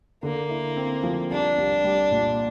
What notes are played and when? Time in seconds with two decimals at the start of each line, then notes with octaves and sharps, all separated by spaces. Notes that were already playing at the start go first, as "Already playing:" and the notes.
0.23 D3 A#3
0.50 E4
0.76 C4
1.03 F3
1.30 C2 D4
1.58 C2
1.84 G3
2.11 A#2